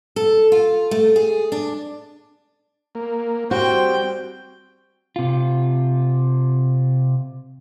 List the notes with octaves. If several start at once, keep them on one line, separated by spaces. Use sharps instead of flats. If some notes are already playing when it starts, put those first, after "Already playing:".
A4
F4
A3
G#4
D4
A#3
G3 C4 F#4 C5 G5
C3 F4